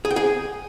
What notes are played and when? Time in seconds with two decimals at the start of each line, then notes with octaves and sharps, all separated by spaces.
0.05 G#4
0.11 G5
0.16 G#4